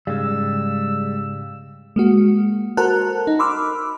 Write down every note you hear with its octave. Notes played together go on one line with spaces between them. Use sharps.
G#2 C#3 G3 G#3 F5 E6
G#3 A#3 F#4
F#4 A4 A#4 C5 A5 F#6
D#4
B5 C6 D6 E6 F6